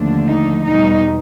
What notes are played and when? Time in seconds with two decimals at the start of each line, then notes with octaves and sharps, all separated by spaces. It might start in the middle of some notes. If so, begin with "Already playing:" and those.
Already playing: D#2 D3 F3 A3 D4
0.28 D#4
0.65 E2 B2 G3 D#4